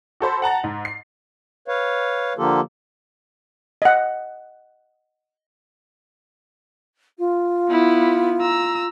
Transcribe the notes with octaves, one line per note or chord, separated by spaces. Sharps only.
F#4 A4 C5 B5
F#5 A5 A#5 A6
G#2
C7
B4 C#5 F5
D3 F3 A#3 F4 G4 A4
D#5 F#5
F4
B3 E4
A#5 E6